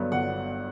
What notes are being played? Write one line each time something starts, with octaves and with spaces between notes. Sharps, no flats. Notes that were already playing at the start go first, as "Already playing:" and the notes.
Already playing: G2 D3 F#3 B3
G1 F#5